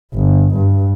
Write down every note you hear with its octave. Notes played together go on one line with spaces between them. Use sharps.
G1
G2